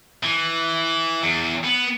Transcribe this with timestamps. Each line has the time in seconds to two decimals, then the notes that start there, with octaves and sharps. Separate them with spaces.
0.24 E3
1.23 E2
1.64 B3